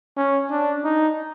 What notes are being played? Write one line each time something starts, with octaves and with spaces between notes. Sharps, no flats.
C#4
D4
D#4